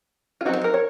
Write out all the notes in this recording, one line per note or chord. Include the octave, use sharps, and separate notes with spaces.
F4
F#3 C4 D#4 F#4
C5
A#4
C#5